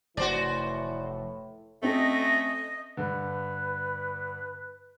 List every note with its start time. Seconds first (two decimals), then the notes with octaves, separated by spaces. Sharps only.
0.17 F1 A2 E3 A3 E4 F#4 C5 D5
1.82 A3 C4 C#4 A4 D#5
2.97 G2 D3 B4